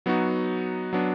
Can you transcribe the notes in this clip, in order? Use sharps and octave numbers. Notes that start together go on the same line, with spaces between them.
F#3 B3 D#4 F#4
F#3 B3 D4